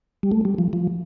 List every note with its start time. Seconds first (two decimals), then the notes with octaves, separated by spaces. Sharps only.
0.23 G3
0.32 A3
0.45 G3
0.58 F3
0.73 F3